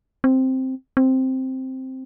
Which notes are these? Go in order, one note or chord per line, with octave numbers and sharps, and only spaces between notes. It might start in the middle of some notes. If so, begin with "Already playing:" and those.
C4
C4